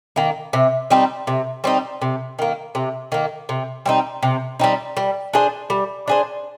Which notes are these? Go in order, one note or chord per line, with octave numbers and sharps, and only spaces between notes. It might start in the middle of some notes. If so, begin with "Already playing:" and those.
D#3 A#3
C3
G3 C4 D#4
C3
G3 C4 D#4
C3
D#3 A#3
C3
D#3 A#3
C3
G3 C4 D#4
C3
G3 C4 D#4
G3
D4 G#4 C5
G3
D4 G#4 C5